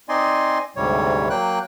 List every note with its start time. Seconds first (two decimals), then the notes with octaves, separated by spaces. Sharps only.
0.09 C4 D#4 D5 D#5 G#5 C6
0.76 D2 G#2 C3 G3 C#5
1.30 F#3 A#3 G5 F#6